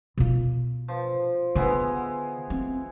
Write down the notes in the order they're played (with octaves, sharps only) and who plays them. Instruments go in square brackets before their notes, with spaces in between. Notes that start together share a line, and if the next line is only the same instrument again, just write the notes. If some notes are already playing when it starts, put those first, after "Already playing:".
[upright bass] B2 F4
[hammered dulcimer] F3
[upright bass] D3 [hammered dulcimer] G#3 B3 E4
[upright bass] C4